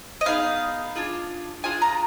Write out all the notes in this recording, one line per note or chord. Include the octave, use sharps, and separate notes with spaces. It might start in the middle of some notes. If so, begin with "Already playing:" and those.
D#5
B3 D#4 G#4 F5
D4 F4 G#4
D4 F4 G#4 G#5
A#5